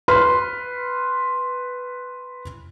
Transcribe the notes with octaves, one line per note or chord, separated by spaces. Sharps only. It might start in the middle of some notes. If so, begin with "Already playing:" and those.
B4 B5 C6 F6